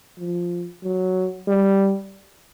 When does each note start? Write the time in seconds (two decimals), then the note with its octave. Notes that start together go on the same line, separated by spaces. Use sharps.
0.19 F3
0.84 F#3
1.48 G3